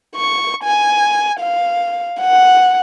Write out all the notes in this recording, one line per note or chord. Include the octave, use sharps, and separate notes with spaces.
C#6
G#5
F5
F#5